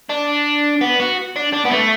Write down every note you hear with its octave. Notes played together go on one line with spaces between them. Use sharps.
D4
B3
F#4
D4
D4
B3
A3